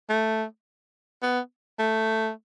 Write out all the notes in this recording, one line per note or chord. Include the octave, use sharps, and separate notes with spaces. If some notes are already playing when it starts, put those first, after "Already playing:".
A3
B3
A3